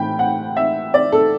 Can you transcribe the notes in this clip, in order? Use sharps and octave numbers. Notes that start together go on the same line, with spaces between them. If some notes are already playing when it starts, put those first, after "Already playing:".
Already playing: A2 E3 G5 B5
F#5
E5
D5
A4